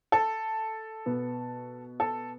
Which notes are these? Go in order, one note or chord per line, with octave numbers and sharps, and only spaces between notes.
A4
B2 B3
A4